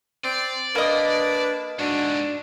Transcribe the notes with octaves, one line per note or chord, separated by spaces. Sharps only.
C4 D5
A#3 D4 B4 D#5
G#2 D3 D4 F#4